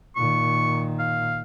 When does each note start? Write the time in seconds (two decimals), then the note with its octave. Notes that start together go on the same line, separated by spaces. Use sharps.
0.16 A#2 D#3 C#6
0.99 F5